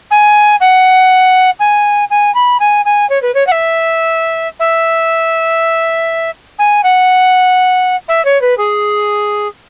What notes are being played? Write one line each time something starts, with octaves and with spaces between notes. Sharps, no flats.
G#5
F#5
G#5
G#5
B5
G#5
G#5
C#5
B4
C#5
F#5
E5
E5
G#5
F#5
E5
C#5
B4
G#4